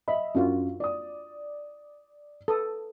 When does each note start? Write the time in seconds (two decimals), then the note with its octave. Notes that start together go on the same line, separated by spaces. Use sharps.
0.08 D#5 E5 B5
0.35 F#2 D4 F4 F#4
0.80 D5 D#6
2.48 A4 B4 D#6